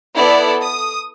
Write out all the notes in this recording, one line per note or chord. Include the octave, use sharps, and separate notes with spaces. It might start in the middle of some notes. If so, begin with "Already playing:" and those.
B3 E4 A4 D5
D#6